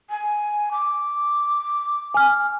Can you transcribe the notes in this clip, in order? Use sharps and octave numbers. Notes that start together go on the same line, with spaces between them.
G#5
D6
G#5 F6